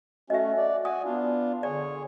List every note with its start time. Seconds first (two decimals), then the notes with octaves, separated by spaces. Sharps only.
0.30 A3 C#4 F#4 D#5 E5
0.58 D5
0.85 F#4 G#5 D#6
1.05 B3 D4 F4
1.63 D3 G#4 C#5 D5